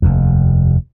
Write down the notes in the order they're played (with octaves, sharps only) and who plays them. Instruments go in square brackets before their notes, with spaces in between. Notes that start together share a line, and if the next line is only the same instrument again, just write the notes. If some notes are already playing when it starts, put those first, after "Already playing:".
[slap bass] F1 D#2